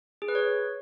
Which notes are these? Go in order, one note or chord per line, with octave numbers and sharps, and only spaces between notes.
G#4
B4
C#5